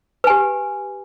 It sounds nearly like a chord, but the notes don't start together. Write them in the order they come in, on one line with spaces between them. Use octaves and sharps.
B4 G#5 G4